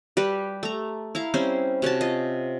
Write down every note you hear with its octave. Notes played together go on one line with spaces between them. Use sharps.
G3 G4 B4
A3 A#5
E4 F5 A#5
G3 C4 C#4 C5
C3 C#4 F#4 A5
F4 D#5